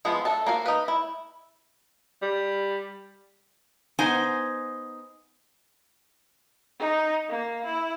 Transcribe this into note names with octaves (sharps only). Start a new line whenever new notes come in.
F3 G#3 B3 E4
D4 A4 E5 A5
A#3 F#4 F5
D#4 B4
E4
G3
B3 D#4 C5 F#5 G#5
D#4
A#3
E4